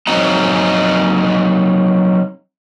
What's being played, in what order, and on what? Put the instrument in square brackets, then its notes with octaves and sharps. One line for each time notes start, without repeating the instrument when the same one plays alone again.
[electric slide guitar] F#3 C4 D#4 D#5 A#5